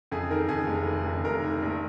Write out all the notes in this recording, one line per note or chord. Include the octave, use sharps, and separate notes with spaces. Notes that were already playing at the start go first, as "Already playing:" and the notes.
F2 G#4
D#3 A#4
F2 G#4
F1
D#3
F2
F1 A#4
D#3
A#1